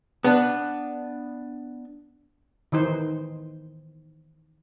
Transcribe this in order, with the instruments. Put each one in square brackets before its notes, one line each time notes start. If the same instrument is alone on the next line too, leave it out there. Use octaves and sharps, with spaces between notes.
[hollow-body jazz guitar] B3 D4
[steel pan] D#3 E3 D#4 C5